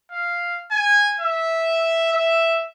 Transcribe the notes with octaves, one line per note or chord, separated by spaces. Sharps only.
F5
G#5
E5
E5